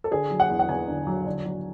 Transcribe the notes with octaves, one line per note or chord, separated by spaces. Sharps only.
A4
D3 G#4
F#3
F#5
E2
F#5
E2 G#5
D3
F#3
D3
F#3